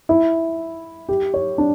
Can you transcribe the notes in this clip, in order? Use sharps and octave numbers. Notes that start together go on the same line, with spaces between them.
E4
G4
C#5
D4